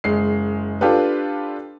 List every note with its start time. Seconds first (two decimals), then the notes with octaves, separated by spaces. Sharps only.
0.04 F#1 G#3 C7
0.81 D4 F4 G4 A4 B4